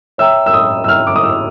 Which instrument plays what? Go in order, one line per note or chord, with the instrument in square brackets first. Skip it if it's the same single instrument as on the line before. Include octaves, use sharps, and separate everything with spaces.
[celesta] C#5 E5 G5 A#5 [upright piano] E6
[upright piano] E6
D#6
E6
[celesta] C#5 E5 G5 A#5 [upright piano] F6
[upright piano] D6
D#6
E6